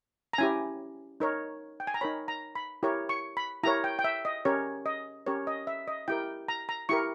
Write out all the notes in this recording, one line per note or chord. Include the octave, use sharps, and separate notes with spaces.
A#5
C#4 E4 G4 G#5
D#4 A#4 C#5
G5
G#5
A#5
D#4 A#4 C#5 B5
A#5
B5
E4 G4 A#4 C#5
C#6
B5
E4 G4 A#4 C#5 A#5
G5
G5
E5
D#5
C#4 G4 A#4 C#5
D#5
C#4 G4 A#4 C#5
D#5
E5
D#5
E4 G4 A#4 G5
A#5
A#5
E4 G4 A#4 C#6